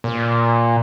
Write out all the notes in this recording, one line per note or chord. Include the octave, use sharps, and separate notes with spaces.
A#2